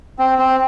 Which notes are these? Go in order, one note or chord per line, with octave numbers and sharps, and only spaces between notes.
C4
C4